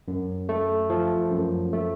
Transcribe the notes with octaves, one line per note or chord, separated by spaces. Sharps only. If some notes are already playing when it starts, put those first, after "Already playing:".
F#2
A3
F3
F#2
A3